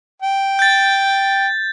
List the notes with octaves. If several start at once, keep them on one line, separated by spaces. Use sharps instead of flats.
G5
G6 A6